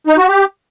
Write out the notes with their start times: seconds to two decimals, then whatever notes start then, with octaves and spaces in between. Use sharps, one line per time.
0.07 D#4
0.18 F#4
0.28 G4